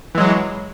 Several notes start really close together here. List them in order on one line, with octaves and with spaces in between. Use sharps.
E3 G#3 F#3